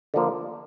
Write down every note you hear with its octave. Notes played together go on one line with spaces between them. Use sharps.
D3 F3 A#3